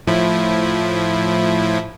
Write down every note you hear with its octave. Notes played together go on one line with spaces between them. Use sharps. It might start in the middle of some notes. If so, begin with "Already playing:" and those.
A2 F3 E4